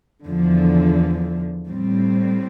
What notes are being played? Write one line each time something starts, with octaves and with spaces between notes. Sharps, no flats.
E2 D3 F3
A2 G3 C4